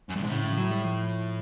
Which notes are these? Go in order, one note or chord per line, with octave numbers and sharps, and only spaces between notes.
F#2
G2
G#2 C3
A2 C#3
C#3
F3
F#3
G3
F3